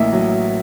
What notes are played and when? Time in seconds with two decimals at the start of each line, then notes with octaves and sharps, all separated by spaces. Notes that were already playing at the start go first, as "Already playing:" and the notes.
Already playing: A1 A2 A#3 D#5 E5
0.13 F#3